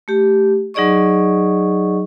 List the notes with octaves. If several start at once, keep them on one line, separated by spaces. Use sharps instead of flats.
A3 G4
F#3 D#4 G#4 D5 D#5 C#6